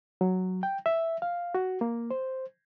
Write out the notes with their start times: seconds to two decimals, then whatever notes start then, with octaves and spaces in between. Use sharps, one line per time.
0.21 F#3
0.63 G5
0.86 E5
1.22 F5
1.55 F#4
1.81 A#3
2.11 C5